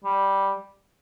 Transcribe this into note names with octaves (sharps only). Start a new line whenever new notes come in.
G3